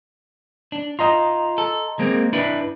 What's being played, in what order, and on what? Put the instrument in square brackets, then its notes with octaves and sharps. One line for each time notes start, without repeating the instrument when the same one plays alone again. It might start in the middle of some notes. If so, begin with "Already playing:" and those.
[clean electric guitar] D4
[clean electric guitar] F4 [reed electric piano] D#5 A#5 C6
[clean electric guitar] A4
G#3 A#3 C4
D4 E4 B4